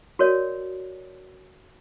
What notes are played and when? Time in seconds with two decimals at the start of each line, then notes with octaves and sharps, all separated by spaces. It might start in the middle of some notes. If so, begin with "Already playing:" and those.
0.19 F#4 A#4 C#5 D5